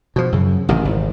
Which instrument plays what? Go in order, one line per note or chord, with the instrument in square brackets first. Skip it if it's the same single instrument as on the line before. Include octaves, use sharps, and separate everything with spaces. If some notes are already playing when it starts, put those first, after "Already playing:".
[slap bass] B2 F3
F#2 C#3
A1 C3 D#3
G#1